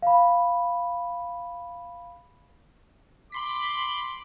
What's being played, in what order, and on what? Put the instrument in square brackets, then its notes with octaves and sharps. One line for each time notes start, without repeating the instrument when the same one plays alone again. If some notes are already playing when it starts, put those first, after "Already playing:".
[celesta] F5 B5
[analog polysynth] B5 C6 B6 [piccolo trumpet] D6